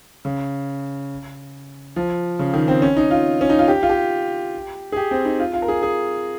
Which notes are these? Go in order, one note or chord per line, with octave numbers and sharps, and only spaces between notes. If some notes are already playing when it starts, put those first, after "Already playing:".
C#3
F3
C#3
D#3
C4
C#4
D#4
F4
C#4
D#4
F4
G4
F4
G4
G#4
G4
C4
D#4
F4
F4
A#4
G#4
G#4